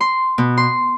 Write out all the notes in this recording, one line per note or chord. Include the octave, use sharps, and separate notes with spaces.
C6
B2
C6